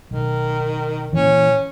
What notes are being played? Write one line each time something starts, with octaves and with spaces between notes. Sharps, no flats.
B1 D#3
A#2 E3 C#4